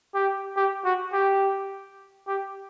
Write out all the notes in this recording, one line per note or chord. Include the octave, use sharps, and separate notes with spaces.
G4
G4
F#4
G4
G4